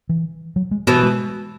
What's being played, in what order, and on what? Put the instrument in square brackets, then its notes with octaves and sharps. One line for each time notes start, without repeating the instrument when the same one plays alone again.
[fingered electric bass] E3
F#3
G#3
[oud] B2 E3 [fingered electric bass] B3
[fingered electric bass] G#3